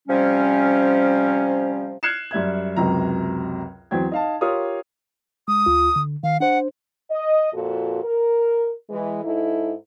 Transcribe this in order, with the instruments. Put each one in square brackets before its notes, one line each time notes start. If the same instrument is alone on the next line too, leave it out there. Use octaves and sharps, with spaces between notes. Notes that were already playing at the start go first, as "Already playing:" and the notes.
[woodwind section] C3 F3 G3 C#4
[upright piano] F6 F#6 G#6 C7 C#7 E7
F#2 G3 E5 G#6
C#2 F#2 C3 F#3 A#5
E2 F#3 C4 G5 G#6
D#4 F5 A5
F4 G4 A#4 C#5 F5 D#6
[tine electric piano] G#3 [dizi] D#6
[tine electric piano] D2 F4
D3
[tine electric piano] D#3 [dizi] F5
[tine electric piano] D4 C5 [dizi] F#5
[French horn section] D#5
F2 A#2 F#4 A4
A#4
E3 G#3
G#2 D#4 E4 A4